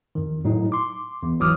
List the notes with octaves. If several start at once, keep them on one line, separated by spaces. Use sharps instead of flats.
F2 D#3
A2 F#3 D#4
C6 D6
E2
G#1 E3 F#3 D6 D#6 F6